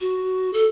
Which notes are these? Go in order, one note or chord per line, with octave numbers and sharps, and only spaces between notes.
F#4
A4